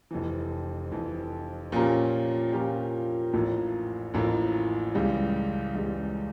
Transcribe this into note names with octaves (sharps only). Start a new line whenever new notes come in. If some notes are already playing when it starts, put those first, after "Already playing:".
F1 F2 E3
F1 F2 E3
A#2 F3 C#4 G4 A#4
A#2 F3 C#4 G4 A#4
A1 A2 F3 A#3
A1 A2 F3 A#3
C#2 C#3 E3 G3
C#2 C#3 E3 G3